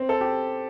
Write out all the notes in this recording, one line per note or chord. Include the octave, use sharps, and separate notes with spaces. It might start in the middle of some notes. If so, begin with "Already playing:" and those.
Already playing: C4
A4
G4